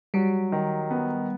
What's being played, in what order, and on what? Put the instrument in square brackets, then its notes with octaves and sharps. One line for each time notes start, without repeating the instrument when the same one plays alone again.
[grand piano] F#3 [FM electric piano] G3
[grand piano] D#3
B3